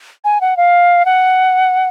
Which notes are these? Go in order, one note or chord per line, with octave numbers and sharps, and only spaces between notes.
G#5
F#5
F5
F#5